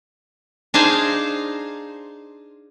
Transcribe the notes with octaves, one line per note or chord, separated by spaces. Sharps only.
D4 D#4 G#4 C5 F5